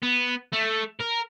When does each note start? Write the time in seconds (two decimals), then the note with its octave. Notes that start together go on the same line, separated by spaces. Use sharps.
0.02 B3
0.52 A3
1.00 A#4